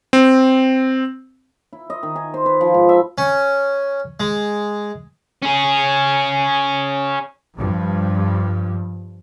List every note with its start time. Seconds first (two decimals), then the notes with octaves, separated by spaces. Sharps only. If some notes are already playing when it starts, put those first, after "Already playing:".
0.13 C4
1.73 E4
1.90 D#5
2.03 D#3
2.16 G#5
2.34 C5
2.46 B4
2.61 F3
2.74 G#2
2.89 E5
3.18 C#4
4.20 G#3
5.42 C#4 G#4
7.56 G2 F3